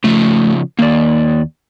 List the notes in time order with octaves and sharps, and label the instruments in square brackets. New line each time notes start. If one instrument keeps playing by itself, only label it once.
[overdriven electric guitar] C#3 F3 [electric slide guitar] A3
[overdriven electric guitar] D#2 [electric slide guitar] A#3 D5